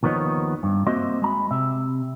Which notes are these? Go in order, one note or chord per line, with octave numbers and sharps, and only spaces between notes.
D#2 D#3 F3 B3 C#5 D#5
G2
A#3 C4 F#4 C5 D#5 E5
G#3 A#5 B5
C3 E5